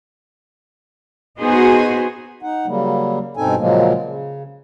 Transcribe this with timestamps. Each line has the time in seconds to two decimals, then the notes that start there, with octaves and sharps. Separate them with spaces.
1.39 B3 D#4 F#4 G#4 C5
2.43 D#4 F#5
2.66 C#3 F#3 G3 A#3
3.37 G2 B2 C4 D#4 A4 G#5
3.58 A#2 C#3 F3 F#3 G#3 A#3
4.03 C#3